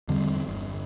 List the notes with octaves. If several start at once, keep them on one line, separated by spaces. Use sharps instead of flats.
E2 D3 G3 C4
G1